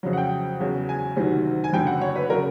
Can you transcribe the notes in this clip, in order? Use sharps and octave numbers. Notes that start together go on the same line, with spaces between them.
F2 C#3 F#3
F#5
G5
E2 C#3 F#3
G#5
D2 C3 D#3 F#3
G#5
F#1 F#2 D3 G5
F#5
C#5
B4
C#3 F#3 A#4